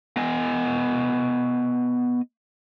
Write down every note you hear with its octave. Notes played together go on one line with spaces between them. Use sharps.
B3 D#5 G#5